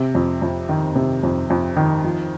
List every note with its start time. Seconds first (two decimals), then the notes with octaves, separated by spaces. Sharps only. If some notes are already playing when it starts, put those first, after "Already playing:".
Already playing: C3
0.15 F2
0.42 F2
0.69 D#3
0.95 C3
1.23 F2
1.50 F2
1.77 D#3
2.04 F3